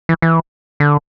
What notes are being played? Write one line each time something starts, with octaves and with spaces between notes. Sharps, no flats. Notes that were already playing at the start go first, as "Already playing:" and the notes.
E3
E3
D3